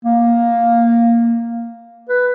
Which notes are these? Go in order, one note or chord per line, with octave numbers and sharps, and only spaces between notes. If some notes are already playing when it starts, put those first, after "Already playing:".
A#3
B4